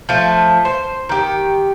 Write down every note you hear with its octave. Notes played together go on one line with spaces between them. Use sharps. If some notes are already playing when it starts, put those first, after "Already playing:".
F3 A3
C5
D#3 G4